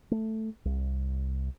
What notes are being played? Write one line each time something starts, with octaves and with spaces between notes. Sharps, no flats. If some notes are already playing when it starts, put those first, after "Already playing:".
A3
C2